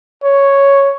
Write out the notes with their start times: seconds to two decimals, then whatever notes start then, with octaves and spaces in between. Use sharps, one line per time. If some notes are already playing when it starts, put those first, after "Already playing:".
0.24 C#5